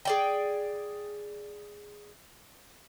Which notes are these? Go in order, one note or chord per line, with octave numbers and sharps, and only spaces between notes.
G#4 D5 G5